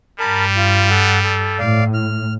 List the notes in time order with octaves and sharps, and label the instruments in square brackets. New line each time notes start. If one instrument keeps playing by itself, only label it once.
[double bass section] G2 [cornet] G3 [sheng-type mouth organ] A#4 A5 B5
[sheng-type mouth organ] F4
A4 F#5
A4
[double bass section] A2 [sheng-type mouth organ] D5 F5
[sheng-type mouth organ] F6